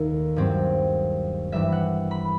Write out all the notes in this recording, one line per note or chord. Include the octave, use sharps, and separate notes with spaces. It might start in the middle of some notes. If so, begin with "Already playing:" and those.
Already playing: D#2 D#3 A3
G2 F#3 C4
G2 E3 G3 E5
F#5
B5